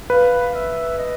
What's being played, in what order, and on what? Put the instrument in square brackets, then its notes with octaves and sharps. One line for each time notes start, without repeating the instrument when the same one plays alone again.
[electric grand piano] B4 [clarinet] F5
[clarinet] E5
D#5